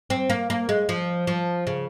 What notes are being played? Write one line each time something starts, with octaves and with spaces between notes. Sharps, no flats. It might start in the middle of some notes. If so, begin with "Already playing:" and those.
C4
A#3
A#3
G#3
F3
F3
C#3